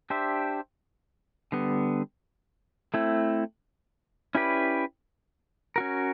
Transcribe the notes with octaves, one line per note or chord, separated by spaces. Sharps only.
D4 G4 C5 E5
D3 G3 B3
A3 C4 E4
C#4 E4 G4 B4 D5
C#4 F#4 A#4